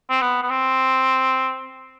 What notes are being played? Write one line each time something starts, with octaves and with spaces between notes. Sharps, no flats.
C4
B3
B3
C4